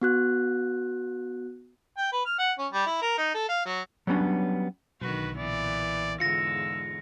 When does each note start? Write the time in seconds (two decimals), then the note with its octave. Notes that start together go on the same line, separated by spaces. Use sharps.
0.02 B3 F#4 F#6
1.98 G5
2.12 B4
2.25 F6
2.39 F#5
2.58 C#4
2.72 G3
2.86 E4
3.01 A#4
3.18 D#4
3.34 A4
3.48 F5
3.65 F#3
4.07 F#3 G3 B3 C#4 D4
5.02 B1 D3 D#3 F#4 B4
5.38 A#2 E3 B3 D5
6.20 E2 G#2 D3 F4 E6 A#6 C#7